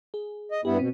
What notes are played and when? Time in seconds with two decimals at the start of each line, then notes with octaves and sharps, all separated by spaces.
0.14 G#4
0.52 D#5
0.65 G2 B3 E4 G4
0.79 B2 C4